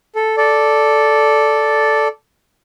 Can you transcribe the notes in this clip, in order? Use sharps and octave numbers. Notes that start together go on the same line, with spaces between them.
A4
A4 D5